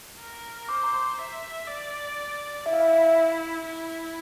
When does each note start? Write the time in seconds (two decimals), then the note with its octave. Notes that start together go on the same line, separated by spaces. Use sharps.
0.20 A#4
0.69 C5 D6
0.83 A#5
0.94 C6
1.19 E5
1.68 D5
2.66 E4 E5
2.73 F5
2.80 E5
3.65 E4